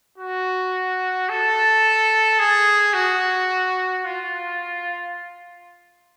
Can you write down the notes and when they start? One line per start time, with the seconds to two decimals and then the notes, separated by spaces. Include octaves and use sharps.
0.18 F#4
1.29 A4
2.39 G#4
2.94 F#4
4.04 F4